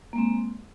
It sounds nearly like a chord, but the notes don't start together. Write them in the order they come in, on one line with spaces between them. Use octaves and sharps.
A#3 G#3 C4